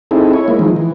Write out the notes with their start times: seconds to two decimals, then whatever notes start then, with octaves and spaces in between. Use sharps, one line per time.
0.11 C4 D#4 E4 G#4 A4
0.33 E4 C#5
0.48 G#3 A#3 E4
0.59 E3 F3 G#3 D#4
0.76 E3